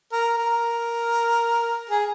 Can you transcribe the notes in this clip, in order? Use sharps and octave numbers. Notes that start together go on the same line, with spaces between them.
A#4
A#4
G#4